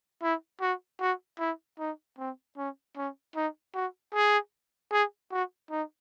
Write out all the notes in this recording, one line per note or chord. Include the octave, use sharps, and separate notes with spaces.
E4
F#4
F#4
E4
D#4
C4
C#4
C#4
D#4
F#4
G#4
G#4
F#4
D#4